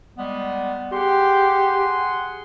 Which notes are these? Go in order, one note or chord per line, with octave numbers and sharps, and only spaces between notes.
G3 G#3 B3
G4 G#4 F#5 C6